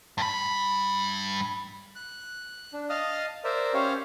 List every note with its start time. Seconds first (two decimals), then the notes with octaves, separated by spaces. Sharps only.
0.18 G2 B5
1.95 F#6
2.73 D4
2.90 D#5 F5 A5 D#6 F6
3.44 A#4 C5 D5 E5
3.74 C#4 G4 C5 C#5 F5